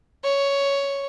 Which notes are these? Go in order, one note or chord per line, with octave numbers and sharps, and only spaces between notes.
C#5